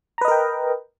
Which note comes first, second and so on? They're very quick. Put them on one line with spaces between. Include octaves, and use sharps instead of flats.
A#5 B4 D#5 A#4 G5